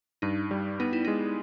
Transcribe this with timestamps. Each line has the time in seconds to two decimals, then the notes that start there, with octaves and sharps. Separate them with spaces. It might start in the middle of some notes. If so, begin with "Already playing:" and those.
0.22 G2 D#4
0.51 G3
0.80 B3 D#4
0.93 E4
1.05 G#3 D#4